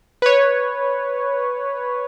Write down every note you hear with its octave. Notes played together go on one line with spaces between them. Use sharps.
B4 C#5